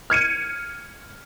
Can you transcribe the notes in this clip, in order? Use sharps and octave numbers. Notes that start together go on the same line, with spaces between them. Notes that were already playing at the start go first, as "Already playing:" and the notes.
F6 G#6 C#7 D#7